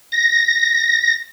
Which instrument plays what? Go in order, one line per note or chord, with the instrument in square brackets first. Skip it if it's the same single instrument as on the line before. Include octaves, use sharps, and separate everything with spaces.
[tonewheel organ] A#6